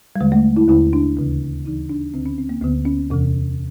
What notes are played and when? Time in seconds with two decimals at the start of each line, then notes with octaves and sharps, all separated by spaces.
0.16 G3
0.20 D#2 D3 G#3
0.32 A3
0.57 E4
0.68 D#2 D3 E4
0.93 D4
1.17 D2 C#3 E3
1.65 D2 C#3 E3 D#4
1.89 D4
2.14 D2 D3 C4
2.26 C#4
2.38 C4
2.49 A#3
2.62 D2 D3 B3
2.85 C#4
3.10 E2 C3 E3